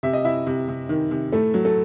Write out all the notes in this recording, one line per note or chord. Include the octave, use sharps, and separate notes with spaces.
C3 E5
D#5
C3 E4 E5
C3
C3
D#3
C3
A2 A3 A4
F#3
A3 A4